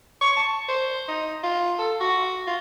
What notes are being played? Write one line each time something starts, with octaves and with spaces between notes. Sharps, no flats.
C#6
A5
C5
D#4
F4
A4
F#4
F4